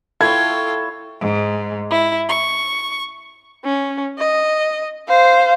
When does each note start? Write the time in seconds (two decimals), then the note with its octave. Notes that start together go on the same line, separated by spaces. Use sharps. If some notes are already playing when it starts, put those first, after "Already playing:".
0.21 E4 F4 A4 C#5 G5 A5 G#6
1.20 G#2
1.90 E4
2.28 C#6
3.65 C#4
4.19 D#5
5.08 C5 F5